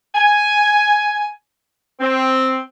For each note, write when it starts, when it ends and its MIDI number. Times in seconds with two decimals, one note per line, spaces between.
0.15 1.30 80
2.01 2.60 60